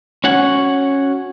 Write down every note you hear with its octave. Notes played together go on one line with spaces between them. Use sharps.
C#4 F#4 F#5 G#5